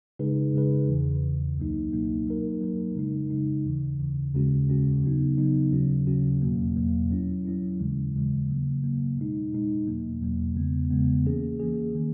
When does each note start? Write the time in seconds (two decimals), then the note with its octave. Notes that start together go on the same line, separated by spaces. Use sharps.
0.19 C#3 G#3 D#4 G#4 B4
0.54 C#3 G#3 D#4 G#4 B4
0.88 E2 C#3 E3
1.23 E2 C#3 E3
1.58 C#2 B2 F#3 A#3 D#4
1.92 C#2 B2 F#3 A#3 D#4
2.27 F#3 A#3 D#4 A#4
2.61 F#3 A#3 D#4 A#4
2.96 C#3 G#3 D#4
3.30 C#3 G#3 D#4
3.65 D#2 C#3 E3
4.00 D#2 C#3 E3
4.34 D#2 C#3 G#3 C#4 F#4
4.69 D#2 C#3 G#3 C#4 F#4
5.03 C#3 F#3 B3 D#4
5.38 C#3 F#3 B3 D#4
5.72 D#2 C#3 F#3 C#4 F#4
6.07 D#2 C#3 F#3 C#4 F#4
6.42 E2 B2 F#3 A#3
6.76 E2 B2 F#3 A#3
7.11 F#3 C#4 E4
7.45 F#3 C#4 E4
7.79 D#2 C#3 E3 G#3
8.15 D#2 C#3 E3 G#3
8.49 C#3 F#3 A#3
8.83 C#3 F#3 A#3
9.18 B2 G#3 D#4
9.52 B2 G#3 D#4
9.87 E2 B2 F#3 A#3
10.21 E2 B2 F#3 A#3
10.56 E2 C#3 G#3 B3
10.91 E2 C#3 G#3 B3
11.25 E3 A#3 C#4 G#4
11.60 E3 A#3 C#4 G#4
11.95 D#3 A#3